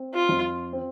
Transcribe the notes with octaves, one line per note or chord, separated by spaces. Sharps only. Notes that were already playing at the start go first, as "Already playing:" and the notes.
Already playing: C4
F4
F2
C4